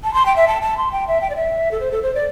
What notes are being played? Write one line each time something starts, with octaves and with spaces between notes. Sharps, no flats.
A5
C6
G5
E5
A5
A5
C6
G5
E5
G5
D5
E5
A4
C5
A4
C5
D5